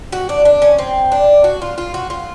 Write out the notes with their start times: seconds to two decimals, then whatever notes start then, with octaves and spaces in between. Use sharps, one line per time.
0.12 F#4
0.29 D4
0.45 D4
0.62 C#4
0.78 C4
1.12 D4
1.44 F#4
1.62 F4
1.78 F4
1.94 F#4
2.10 F4